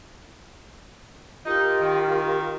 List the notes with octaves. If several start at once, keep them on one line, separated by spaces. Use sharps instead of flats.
D#4 F4 G4 A#4
D#3